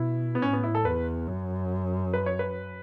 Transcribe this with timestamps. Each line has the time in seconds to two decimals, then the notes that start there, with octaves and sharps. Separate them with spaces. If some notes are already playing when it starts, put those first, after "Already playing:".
Already playing: B2 E4
0.35 B3
0.42 A2 C#4
0.53 B3
0.63 E4
0.75 A4
0.85 E2 B4
1.28 F#2
2.14 B4
2.26 C#5
2.39 B4